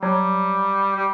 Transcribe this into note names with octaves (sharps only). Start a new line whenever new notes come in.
F#3 G3
G3